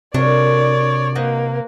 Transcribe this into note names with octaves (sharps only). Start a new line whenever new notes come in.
C3 D4 F#4 A4 A#4 C#5 D5
A#3 F#4 B4 C5 D#5